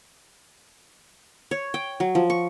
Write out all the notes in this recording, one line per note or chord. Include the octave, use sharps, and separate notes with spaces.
C#5
G5
F#3
F3
C#6